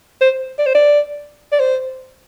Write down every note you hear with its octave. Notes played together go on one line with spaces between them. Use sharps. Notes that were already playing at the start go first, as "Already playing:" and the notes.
C5
D5
C5
D5
D5
C5